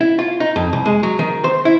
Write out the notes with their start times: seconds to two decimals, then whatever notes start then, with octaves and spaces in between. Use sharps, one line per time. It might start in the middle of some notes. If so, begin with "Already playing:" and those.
0.01 E4
0.19 F4
0.40 D#4
0.56 F2
0.73 C2
0.86 G#3
1.03 F#3
1.19 D#3
1.44 C5
1.65 E4